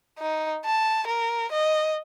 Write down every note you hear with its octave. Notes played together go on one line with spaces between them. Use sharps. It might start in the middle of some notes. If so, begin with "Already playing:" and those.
D#4
A5
A#4
D#5